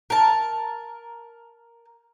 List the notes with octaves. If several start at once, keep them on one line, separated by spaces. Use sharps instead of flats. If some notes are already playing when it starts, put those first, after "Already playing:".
A#4 A5